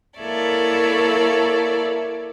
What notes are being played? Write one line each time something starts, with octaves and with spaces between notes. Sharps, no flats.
A#3 E4 A4 C#5 D5 E5